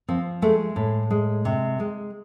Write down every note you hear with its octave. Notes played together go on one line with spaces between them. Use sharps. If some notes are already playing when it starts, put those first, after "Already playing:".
F3 C4
G#3 A3
A2
G#3
C3
G#3